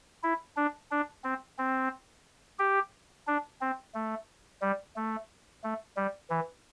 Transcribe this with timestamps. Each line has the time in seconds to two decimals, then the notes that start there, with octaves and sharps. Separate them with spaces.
0.23 E4
0.56 D4
0.91 D4
1.24 C4
1.58 C4
2.59 G4
3.27 D4
3.61 C4
3.94 A3
4.62 G3
4.96 A3
5.64 A3
5.97 G3
6.30 E3